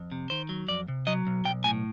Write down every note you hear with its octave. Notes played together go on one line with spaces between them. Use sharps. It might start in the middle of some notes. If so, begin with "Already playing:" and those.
Already playing: F2
C3
D#3 C5
F#3
F2 D5
C3
F#3 D#5
B1
B1 G5
A2 G#5